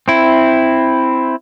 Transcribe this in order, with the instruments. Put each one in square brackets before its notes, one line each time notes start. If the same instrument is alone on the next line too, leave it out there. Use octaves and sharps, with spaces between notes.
[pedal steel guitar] C4 E4